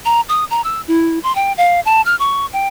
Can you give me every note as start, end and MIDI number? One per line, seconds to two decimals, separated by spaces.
0.05 0.21 82
0.29 0.45 87
0.51 0.61 82
0.64 0.81 88
0.88 1.19 64
1.23 1.34 84
1.35 1.53 79
1.57 1.80 77
1.85 2.02 81
2.06 2.16 89
2.19 2.46 85
2.53 2.68 79